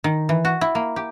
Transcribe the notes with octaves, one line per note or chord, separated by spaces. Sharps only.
D#3
E3
F#4
E4
A#3
G4